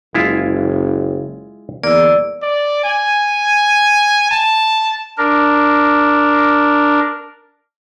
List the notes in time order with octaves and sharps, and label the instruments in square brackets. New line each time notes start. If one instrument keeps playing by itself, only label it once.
[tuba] F#1 [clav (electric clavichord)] G#3 E4 F4
[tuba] E2 [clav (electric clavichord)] A#3 [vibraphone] D5 E6
[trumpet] D5
G#5
A5
[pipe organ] D4 A#4